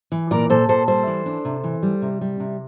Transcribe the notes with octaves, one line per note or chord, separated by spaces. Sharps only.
E3
A#2 A#4 D5
A#2 A4 C5
A#2 A4 C5
G3 A4 C5
E3
D4
C3
E3
G3
C3
G3
C3